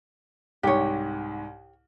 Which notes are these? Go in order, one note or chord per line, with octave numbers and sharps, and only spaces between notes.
C2 G#2 G4 C#5